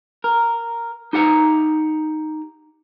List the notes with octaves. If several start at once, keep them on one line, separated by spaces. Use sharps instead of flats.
A#4
D#4 G4 F#5 A#5